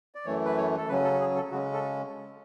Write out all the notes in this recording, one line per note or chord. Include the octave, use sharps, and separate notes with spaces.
D5
F#2 E3 A3 C#5
B4
C#5
A4
C#3 F#3 C#4 B4
A4
G#4
A4
C#3 G#3 C#4 F#4
A4